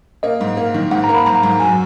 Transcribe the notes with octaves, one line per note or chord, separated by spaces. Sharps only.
A#3 D#5
G#2
A#3
D#3
G#2 F#5
A#5
A#3
B5
G#2 A#5
G#2
F#2 G#5